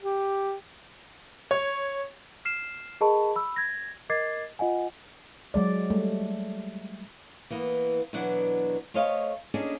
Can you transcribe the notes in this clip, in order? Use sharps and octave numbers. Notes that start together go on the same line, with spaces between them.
G4
C#5
F6 C7 E7
G#4 A#4 D#5 A5 B5 C#6
B5 E6
G#6 A#6
A#4 D#5 D6 G#6 A6 C7
F4 D#5 F#5 G#5
F#3 G#3 D5
G3 A3
E3 A#3 B3
B2 E3 F#3 B3 D4 F#5
A3 C5 C#5 D#5 F5
A#3 C#4 D4 G#4 A4 D#5